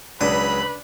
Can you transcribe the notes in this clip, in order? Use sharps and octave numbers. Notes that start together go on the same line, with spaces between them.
C#2 F#3 D4 B4 B5 D#6